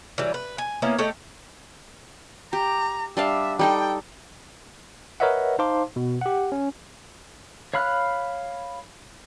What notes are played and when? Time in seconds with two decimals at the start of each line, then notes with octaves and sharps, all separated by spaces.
0.18 E3 F#3 G3
0.34 B4
0.58 G#5
0.82 A#3 B3 C#4 E4
0.99 A3 G4 C#5 D#5
2.53 G4 A#5
3.17 G3 D4 E5 F5
3.59 G3 D#4 A4 G5
5.20 A#4 B4 C#5 D#5 E5 F#5
5.59 D#4 C5 F5 A5 C6 D6
5.96 B2
6.21 G4 F#5
6.52 C#4
7.74 C#5 F5 B5 F6 F#6